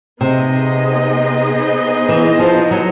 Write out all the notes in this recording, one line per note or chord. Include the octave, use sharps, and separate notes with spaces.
C3 B3 D#4 G#4 C5 D#5
E3
F3
F#3